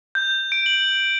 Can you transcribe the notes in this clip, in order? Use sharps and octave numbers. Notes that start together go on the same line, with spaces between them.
G6
D7
F#7